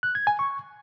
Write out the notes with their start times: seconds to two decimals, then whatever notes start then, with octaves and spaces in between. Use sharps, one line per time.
0.03 F#6
0.15 G#6
0.27 G#5
0.39 C#6